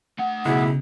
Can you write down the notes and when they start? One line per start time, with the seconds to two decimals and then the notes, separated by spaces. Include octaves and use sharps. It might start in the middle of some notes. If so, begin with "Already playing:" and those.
0.19 A3 F#5
0.45 B1 C#3 E4 G#4